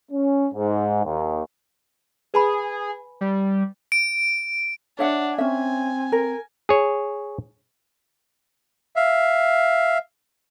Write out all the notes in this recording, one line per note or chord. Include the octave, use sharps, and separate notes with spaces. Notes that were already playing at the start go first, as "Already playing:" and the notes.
C#4
G#2
D#2
G#4 B4 G#5 B5
G3
D7
D4 C#5 E5 F#5
C4 C#4 E5 G#5
A#4
G#4 C#5
E5 F5